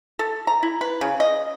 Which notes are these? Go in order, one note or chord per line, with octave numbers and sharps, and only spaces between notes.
A4
A#5
E4
B4
C#3
D#5